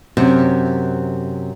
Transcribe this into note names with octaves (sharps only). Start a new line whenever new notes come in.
F#2 C3